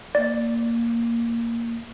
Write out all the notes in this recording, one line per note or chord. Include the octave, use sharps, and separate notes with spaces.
A#3 D5